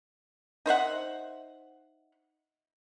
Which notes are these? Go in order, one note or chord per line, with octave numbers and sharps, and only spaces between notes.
D#4 C5 E5 F#5